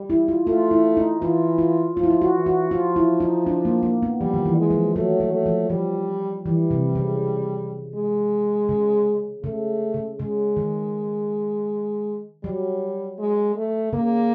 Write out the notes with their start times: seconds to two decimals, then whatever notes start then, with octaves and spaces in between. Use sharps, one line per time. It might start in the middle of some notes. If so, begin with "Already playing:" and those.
Already playing: G3
0.10 E4
0.28 F4
0.47 A3 F4
0.71 E4
0.97 D#4
1.22 E3 F4
1.58 F4
1.96 F3 F4
2.03 E4
2.10 F4
2.21 F#4
2.34 E3
2.46 F#4
2.71 F3 F4
2.96 E4
3.20 D#4
3.47 D4
3.65 A#3
3.83 A#3
4.02 B3
4.21 F3 G3
4.34 D#3
4.45 E3
4.58 G#3
4.71 F3
4.95 F#3 A3
5.20 F#3
5.33 A3
5.46 F3
5.70 F3 G3
6.45 E3 G3
6.71 C3
6.95 C#3
7.95 G#3
8.69 C#3
9.44 C#3 A3
9.94 C#3
10.19 C#3 G#3
10.57 D#3
12.43 F#3 G3
13.19 G#3
13.56 A3
13.93 C#3 A#3